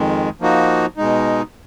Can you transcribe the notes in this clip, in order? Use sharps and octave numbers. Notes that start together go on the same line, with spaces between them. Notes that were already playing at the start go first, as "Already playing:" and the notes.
Already playing: F2 D#3 G#3
F3 A#3 D#4 F#4
B2 G#3 D#4